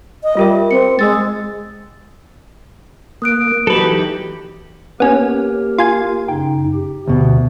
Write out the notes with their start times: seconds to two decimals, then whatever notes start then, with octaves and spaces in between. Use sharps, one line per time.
0.23 D#5
0.37 G3 F4 A#4 E5
0.71 C4 C#7
0.99 G#3 D#5 E6 A6
3.22 A#3 D#6 F#6 D7
3.67 E3 F#3 D#4 G4 A4 B4
5.00 A#3 B3 C#4 G4 A#4
5.78 F4 G#5
6.28 F#2 C#3 D#4 G5
6.74 G4
7.07 D2 B2 A3